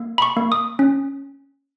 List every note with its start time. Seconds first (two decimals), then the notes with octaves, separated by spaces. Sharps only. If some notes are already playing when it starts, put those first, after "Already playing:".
Already playing: A#3
0.18 B5
0.22 C#6
0.37 A#3
0.52 D#6
0.79 C#4